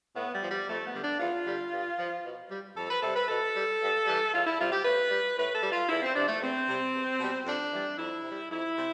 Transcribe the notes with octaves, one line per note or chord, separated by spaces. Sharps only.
A2 B3
G3
F3
G3
F2 A3
B3
D3 G3
D4
E2 F4
D3 G3
G2
F3
B2
G3
F2 A4
B4
C3 G3 A4
B4
B2 A4
G3
G2
E3 G3
E2 F4
E4
C3 G3 F4
G4
A2 B4
G3
A2 B4
A4
G3
F4
E2 E4
C4
C3 F3 D4
A3
E2 C4
C3 G3
E2
B2 G3
F2 D4
E3 G3
F2 E4
C3 G3
F2 E4
C3 G3